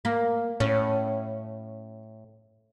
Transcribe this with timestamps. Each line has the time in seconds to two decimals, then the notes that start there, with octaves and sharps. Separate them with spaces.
0.05 A#3
0.60 A2 C#4